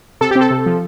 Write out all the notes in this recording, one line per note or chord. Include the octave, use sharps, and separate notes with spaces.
C3 A4
G4
C4
A4
C3
F3